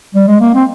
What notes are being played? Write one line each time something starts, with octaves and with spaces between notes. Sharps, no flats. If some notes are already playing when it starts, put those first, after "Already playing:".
G3
G#3
A#3
C4